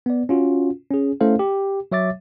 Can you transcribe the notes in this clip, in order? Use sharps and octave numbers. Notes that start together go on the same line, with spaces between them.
B3 D5
C#4 F4 F#4
C#4 G#4
A3 C#4 E4 A4 C5 F5
G4
F#3 C#5 E5 D6 A6